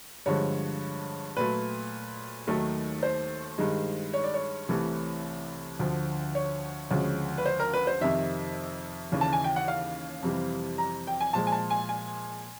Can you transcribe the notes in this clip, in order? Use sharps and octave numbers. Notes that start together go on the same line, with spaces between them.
G2 D3 F3 G#3 C#5
A#2 F#3 A3 B4
D#2 D#3 F#3 A3
C5
G2 D#3 G#3
C#5
D5
C#5
C2 C3 E3 A3
D2 D3 F3
C#5
D2 C#3 F3 G#3
B4
C5
A#4
B4
C5
F2 C3 D#3 E5
D#2 C#3 E3
A5
G#5
G5
F#5
F5
F2 C3 E3 G3
A#5
G5
G#5
A#2 F3 G#3 A5
G#5
A5
G#5
G#5